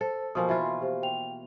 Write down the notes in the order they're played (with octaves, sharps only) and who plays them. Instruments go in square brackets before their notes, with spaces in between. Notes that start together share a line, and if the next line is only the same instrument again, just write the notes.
[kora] A4 [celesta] C5
[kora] B2 F3 A#3 [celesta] G#5 D#6
[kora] E3 F4 [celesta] F#4 B5 C6
[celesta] G4 C5 F5
G5 F7